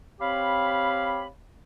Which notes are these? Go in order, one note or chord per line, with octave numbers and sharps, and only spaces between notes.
C4 G4 C#5 F5 B5